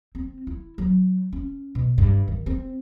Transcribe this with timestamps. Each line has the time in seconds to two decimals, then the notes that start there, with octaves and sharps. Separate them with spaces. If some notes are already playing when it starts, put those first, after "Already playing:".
0.15 C4
0.47 E4
0.78 F#3
1.33 C#4
1.75 B2
1.98 G2
2.28 D#3
2.46 C4